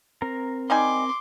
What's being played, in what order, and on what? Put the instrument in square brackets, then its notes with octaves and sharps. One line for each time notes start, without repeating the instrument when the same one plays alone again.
[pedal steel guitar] C4 A#4 A#5
[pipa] G3 D#4 G#5 [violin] C6 D6